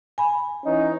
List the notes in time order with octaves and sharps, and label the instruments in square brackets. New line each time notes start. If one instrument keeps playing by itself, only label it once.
[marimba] G#5 B5
[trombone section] E3 C#4 D#4